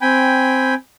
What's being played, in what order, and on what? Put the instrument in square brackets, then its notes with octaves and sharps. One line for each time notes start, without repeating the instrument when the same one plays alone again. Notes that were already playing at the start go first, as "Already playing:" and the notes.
[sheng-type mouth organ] C4 G5 G#5 B5